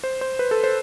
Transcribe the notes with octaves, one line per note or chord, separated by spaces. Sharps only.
C5
C5
B4
A4
C5